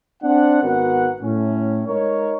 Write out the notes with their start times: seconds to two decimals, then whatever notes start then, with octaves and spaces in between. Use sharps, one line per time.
0.23 C4 D4 F#5
0.62 G#1 B3 F#4 A#4 F#5
1.22 A2 C#4
1.86 G#3 D#4 A#4 C#5